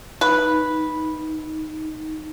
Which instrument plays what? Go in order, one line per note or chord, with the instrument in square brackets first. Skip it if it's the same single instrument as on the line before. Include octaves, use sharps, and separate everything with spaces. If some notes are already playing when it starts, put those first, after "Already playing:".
[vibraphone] D#4 [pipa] B4